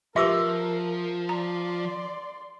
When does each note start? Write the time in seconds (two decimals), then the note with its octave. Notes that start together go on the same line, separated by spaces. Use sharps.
0.16 F3 F4 G4 A#4 B4 E5 D6 E6
1.29 D5 A#5 C6